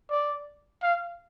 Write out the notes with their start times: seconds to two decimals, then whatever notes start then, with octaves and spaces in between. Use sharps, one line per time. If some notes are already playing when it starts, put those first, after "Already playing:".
0.10 D5
0.82 F5